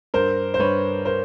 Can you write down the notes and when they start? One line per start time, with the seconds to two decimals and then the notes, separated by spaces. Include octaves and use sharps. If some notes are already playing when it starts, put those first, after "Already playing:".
0.14 G2 A#4 C5
0.54 C5
0.59 G2 B4 C#5
1.05 A#4 C5